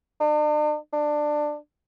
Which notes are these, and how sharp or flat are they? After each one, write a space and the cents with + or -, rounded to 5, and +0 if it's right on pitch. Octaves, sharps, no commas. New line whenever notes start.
D4 +45
D4 +15